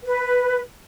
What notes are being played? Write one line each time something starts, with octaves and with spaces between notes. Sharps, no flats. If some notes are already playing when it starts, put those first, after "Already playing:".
B4